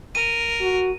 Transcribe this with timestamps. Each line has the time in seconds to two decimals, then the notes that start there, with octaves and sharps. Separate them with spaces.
0.15 A#4 D#7
0.61 F#4